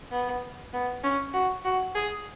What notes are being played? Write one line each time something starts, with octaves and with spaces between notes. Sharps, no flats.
B3
B3
C#4
F#4
F#4
G#4